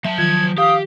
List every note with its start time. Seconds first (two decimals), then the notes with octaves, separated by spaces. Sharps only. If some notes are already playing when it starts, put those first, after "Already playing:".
0.05 F#3 E5 A5
0.18 D#3 F3 F4 G#6
0.58 G4 F5 D#6